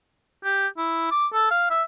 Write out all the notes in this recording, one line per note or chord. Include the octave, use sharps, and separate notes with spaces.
G4
E4
D6
A4
F5
E5